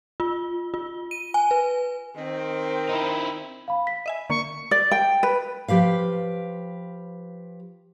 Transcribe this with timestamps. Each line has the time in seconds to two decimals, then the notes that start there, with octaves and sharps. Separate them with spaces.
0.20 F4
0.74 F4
1.11 D#7
1.34 G#5
1.51 B4
2.17 D#3 C4
2.89 D#4 E4
3.68 F5 B5
3.87 B6
4.06 D#5 E5 G#5
4.30 D3 A#3 C#6
4.71 D5
4.91 G5
5.23 B4
5.68 F3 G4 B4 F5